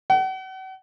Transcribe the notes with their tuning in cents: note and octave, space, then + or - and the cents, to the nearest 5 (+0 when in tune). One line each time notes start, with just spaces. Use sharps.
F#5 +40